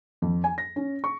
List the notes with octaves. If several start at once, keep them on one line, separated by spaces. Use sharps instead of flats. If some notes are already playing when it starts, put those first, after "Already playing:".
F2
G#5
A#6
C#4
C#6